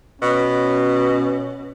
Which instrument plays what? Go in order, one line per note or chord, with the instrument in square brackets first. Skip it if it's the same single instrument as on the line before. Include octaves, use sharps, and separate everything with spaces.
[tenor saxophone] B2 [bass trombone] C#4